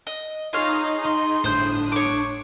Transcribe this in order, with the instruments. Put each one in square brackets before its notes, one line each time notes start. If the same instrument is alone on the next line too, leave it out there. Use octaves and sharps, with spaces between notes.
[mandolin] D#5
[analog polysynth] D#4 G#4 D#5 [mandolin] F4 C#5 F5
[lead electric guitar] C6
[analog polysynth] G1 A2 D#6 [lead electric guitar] D4 [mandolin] C5 G6
[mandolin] C#5 D6